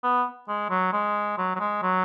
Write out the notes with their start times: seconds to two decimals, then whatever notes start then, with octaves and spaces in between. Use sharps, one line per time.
0.04 B3
0.48 G#3
0.70 F#3
0.93 G#3
1.38 F#3
1.56 F#3
1.60 G#3
1.83 F#3